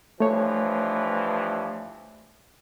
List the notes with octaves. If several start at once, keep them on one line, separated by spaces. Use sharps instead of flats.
G2 E3 F3 A3 C#5